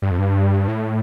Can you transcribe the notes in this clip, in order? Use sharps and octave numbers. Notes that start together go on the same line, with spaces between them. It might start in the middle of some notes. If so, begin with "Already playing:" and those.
G2
F2
G2
A2